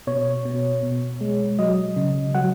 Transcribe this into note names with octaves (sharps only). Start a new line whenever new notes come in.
B2 C#5
B2
B2
G#3
F#3 D#5
C#3
F#3 F#5